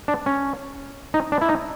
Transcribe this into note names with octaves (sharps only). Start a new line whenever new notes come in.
D4
C#4
D#4
D4
E4
D#4